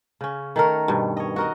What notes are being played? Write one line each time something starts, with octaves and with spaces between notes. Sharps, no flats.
C#3 C#4
D#3 A3 A#4
G2 B2
C#5 D#5
F#4 A#4 D#5